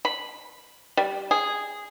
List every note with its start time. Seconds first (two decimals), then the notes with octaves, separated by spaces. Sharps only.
0.05 B5
0.97 G3
1.31 G#4